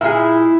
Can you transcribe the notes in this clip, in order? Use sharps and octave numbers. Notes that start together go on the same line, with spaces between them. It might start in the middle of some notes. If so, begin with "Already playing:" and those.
A#2 G#3 D#4 E4 G#4